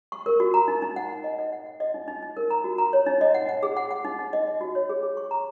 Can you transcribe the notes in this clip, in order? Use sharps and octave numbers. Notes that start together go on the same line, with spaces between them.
C#6
A#4
F#4
A#5
D#4
D#4
F#5
F#5
D#5
D#5
F#5
F#5
D#5
D#4
D#4
D#4
A#4
A#5
F#4
A#5
C#5
D#4
D#5
F#5
F#5
G#4
F#5
F#5
D#4
D#4
D#5
D#5
F#4
C#5
G#4
G#4
C#6
A#5